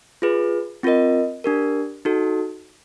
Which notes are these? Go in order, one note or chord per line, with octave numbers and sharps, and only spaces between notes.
F4 G#4 B4
C4 F4 A#4 D#5
D4 G4 A#4
D#4 F#4 A4